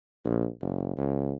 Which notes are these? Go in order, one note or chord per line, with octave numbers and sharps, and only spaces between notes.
A#1
F#1
C#2